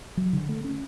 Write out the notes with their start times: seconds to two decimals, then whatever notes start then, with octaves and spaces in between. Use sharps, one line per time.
0.17 F#3
0.33 D3
0.49 A3
0.64 C#4